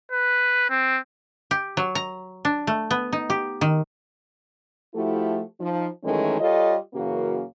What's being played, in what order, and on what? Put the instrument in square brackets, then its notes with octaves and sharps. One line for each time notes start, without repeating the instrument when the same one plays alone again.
[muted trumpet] B4
C4
[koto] G4
F#3
A#5
D4
A3
B3
D#4
G4
D#3
[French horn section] F3 A3 E4 F#4 G4 A4
F3 D#4
F#2 D#3 E3 G#3 A3 C#4
G3 F4 A4 C#5 D#5
F#2 C#3 E3 A#3 C#4 F#4